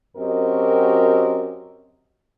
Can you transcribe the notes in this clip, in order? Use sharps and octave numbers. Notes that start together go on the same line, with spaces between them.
F#2 C4 F#4 G4 A#4 D#5